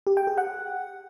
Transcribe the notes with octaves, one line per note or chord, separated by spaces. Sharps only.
G4
G5
G#4
F#5